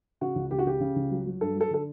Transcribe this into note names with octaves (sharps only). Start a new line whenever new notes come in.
C#3 F#4
C#2
C#2 G4
F#4
C#3 G4
C#3
C#2
F#3
F#3
G2 A4
F#3
A4
D3 A4